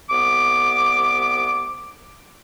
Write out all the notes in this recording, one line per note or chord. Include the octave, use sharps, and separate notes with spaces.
C2 B3 D6